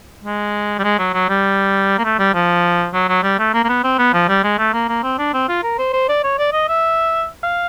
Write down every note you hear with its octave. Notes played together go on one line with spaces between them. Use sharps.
G#3
G3
G#3
F#3
F#3
G3
A#3
A3
G3
F3
F#3
F#3
G3
A3
A#3
A#3
B3
C4
B3
F3
G3
G#3
A3
A#3
A#3
C4
D4
C4
F4
A#4
C5
C5
D5
C#5
D5
D#5
E5
F5